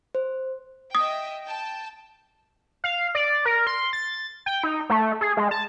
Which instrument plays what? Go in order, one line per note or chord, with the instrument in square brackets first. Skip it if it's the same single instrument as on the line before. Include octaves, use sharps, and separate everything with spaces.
[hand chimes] C5
[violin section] D#5 E5 G5 [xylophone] D#6
[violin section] G5 A5
[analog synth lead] F5
D5
A#4
C6
A6
G5
D#4
A3
G#4
G#3
A5